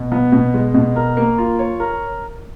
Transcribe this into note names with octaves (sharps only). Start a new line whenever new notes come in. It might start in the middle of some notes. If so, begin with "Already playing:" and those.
Already playing: B2
B3
B2
G#3
B2
A#4
A#3
F4
C#5
A#4